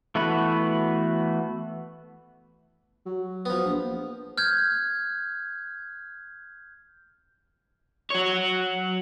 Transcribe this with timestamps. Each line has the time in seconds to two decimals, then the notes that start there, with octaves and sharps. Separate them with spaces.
0.15 E3 A3 B3 F#4 B4
3.06 F#3
3.46 F3 B3
3.65 A#1
4.38 F6 G6 G#6
8.11 F#4 C#5